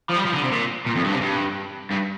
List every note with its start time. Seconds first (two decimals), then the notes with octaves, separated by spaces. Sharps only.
0.10 F3
0.17 G3
0.26 F3
0.35 D3
0.43 C3
0.52 A#2
0.86 A#2
0.96 F2
1.04 G2
1.12 C3
1.21 G2
1.91 G2